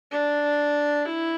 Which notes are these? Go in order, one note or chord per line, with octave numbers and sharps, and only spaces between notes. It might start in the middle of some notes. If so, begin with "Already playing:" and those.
D4
E4